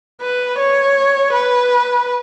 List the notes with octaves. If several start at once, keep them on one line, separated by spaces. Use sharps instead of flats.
B4
C#5
B4